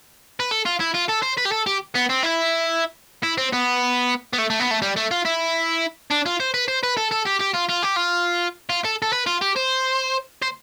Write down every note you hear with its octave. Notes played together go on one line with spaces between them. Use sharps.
B4
A4
F4
E4
F4
A4
C5
B4
G4
A4
G4
B3
C4
E4
E4
C4
B3
B3
A3
A3
B3
A3
G3
A3
F4
E4
D4
F4
C5
B4
C5
B4
A4
A4
G4
G4
F4
F4
G4
F4
F4
A4
A4
B4
F4
G4
C5
C5